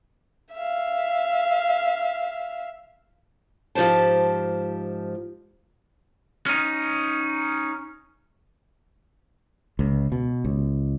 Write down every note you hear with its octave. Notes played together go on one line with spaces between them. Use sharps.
E5 F5
G#2 F3 G4 C5 A5
C#4 D#4
C#2
B2
C#2